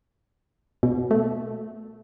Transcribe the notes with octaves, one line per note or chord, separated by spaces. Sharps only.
B2
A3